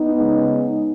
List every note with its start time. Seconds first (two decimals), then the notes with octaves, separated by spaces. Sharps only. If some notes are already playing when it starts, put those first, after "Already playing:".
Already playing: B3 D#4
0.17 C#3 G#3